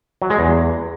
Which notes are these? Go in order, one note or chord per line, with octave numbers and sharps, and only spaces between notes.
F#3
G#3
E2